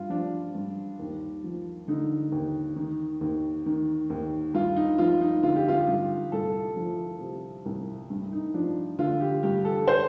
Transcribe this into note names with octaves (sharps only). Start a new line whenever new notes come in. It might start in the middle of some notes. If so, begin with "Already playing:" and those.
Already playing: G2 F4
F3 D4
G2
D#2
F3
D3 D#4
D#2
D#3
D#2
D#3
D#2
G2 F4
D#4
F3 F4
D#4
D3 F4
G4
F4
G4
G2 F4
C2 A4
F3
C3
C2
G2
D#4
F3 D4
D3 F4
G4
G2 G4
A4
C5